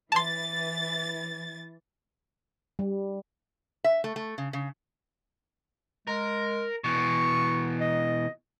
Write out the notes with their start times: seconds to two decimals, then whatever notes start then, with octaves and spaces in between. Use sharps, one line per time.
0.12 E3 A5 C6 A6
2.79 G3
3.84 E5
4.04 A3
4.16 A3
4.38 C#3
4.53 C#3
6.07 G#3 A#4
6.84 B2 E3 C#6
7.80 D#5